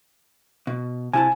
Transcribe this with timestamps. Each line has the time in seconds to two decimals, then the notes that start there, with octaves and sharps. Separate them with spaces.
0.67 B2
1.14 C3 E4 G#5 A5